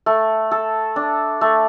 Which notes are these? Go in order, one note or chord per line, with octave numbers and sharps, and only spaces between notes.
A3
A4
D4
A3